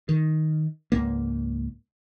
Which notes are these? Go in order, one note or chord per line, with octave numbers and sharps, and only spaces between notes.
D#3
C#2 G#2 A#3